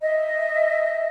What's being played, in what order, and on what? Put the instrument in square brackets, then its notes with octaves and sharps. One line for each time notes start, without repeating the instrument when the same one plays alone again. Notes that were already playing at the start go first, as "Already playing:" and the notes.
[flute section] D#5 E5